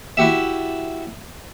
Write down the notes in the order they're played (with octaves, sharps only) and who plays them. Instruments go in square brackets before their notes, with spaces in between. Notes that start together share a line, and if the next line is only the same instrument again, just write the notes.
[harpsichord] E4 F#4 G4 E5